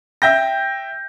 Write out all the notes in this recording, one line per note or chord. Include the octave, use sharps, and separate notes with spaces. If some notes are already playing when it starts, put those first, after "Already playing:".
E5 G5 G6 A#6